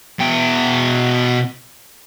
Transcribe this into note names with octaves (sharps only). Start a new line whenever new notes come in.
B2 G5